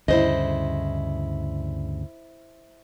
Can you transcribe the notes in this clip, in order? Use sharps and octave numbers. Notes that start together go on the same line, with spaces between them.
D2 G2 C#3 E4 C5 D#5